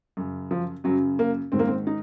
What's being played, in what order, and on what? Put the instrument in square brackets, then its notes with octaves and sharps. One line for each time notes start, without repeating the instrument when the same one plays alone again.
[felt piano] F#2 C#3
F3
F#2 C#3 F#3
A#3
G#2 D#3 C4
A#3
C4
D#4